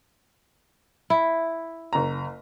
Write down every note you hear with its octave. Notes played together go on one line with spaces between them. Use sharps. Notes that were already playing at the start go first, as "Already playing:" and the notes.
E4
F#1 A#5